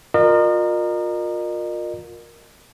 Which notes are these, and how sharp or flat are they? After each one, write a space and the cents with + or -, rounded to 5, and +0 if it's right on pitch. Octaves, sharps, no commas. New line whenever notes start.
F4 +30 A#4 +0 D#5 -40